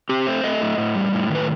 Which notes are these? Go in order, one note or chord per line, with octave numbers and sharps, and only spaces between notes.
C4 G4
A3 C5
A3 D#5
A2
A2
G3
A2
D#3 B4